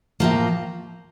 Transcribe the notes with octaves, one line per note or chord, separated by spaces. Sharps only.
A2 F3 A#3